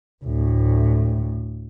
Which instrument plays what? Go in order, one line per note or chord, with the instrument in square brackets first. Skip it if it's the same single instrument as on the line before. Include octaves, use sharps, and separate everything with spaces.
[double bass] D2 A2